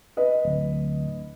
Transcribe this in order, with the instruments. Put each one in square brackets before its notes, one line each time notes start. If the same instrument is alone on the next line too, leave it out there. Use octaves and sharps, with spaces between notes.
[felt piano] B4 D#5
[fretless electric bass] D1